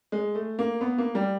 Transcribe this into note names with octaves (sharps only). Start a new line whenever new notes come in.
G#3
A3
A#3
B3
A#3
G3